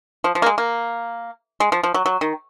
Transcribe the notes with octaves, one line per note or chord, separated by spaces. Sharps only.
F3
F3
A#3
G#3
A#3
G#3
F3
F3
F#3
F#3
D#3